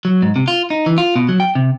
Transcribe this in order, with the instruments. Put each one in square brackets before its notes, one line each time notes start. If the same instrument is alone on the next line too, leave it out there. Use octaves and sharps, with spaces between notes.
[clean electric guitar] F#3
G#2
C3
F4
D#4
E3
F4
B2
F#3
G5
C3